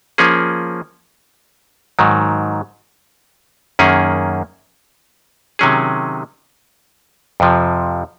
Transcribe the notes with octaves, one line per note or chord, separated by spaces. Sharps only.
F3 A#3 C#4 G#4
G#2 D#3 F#3
F#2 D#3 A#3 C#4 G#4
C3 D#3 F#3 C#4 G#4
F2 C3 F3